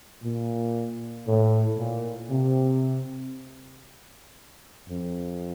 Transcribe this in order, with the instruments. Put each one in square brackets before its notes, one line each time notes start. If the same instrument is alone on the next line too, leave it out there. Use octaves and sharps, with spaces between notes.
[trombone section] A#2
A2
A#2
C3
F2